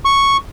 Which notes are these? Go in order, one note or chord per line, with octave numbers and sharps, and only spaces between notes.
C#6